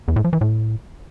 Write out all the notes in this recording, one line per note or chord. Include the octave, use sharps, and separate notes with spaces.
E2
A2
F3
E3
A2